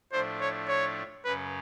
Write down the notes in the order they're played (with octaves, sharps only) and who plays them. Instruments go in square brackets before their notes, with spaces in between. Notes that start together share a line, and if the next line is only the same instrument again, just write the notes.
[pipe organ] A2 F3 A3 D4 [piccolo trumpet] C5
[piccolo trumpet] C#5
C#5
[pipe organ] F#2 C#3 F#3 [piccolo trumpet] B4